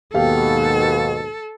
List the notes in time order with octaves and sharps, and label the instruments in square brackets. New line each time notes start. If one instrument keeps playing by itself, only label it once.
[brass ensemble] D#2 G#2 B2 [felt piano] G4 F5 [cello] A4